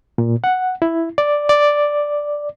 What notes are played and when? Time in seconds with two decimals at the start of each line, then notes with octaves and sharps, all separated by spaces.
0.18 A#2
0.44 F#5
0.82 E4
1.18 D5
1.49 D5